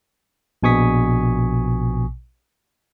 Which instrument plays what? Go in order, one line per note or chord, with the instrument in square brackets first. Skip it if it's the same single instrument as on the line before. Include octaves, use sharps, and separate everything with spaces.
[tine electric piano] A#1 B2 G#5 C#6 D#6 B6